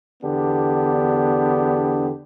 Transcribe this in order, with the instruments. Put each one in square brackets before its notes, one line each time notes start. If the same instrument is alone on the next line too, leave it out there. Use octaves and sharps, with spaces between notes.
[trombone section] E2 D3 B3 D4 G4